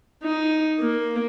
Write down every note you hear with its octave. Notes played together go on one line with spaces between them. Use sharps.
D#4
A#3